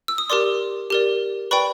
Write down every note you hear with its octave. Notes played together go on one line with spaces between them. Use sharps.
E6
D#6
G4 A#4 D5 C6 D6
G4 A#4 D5
B4 D5 G5 B5 C#6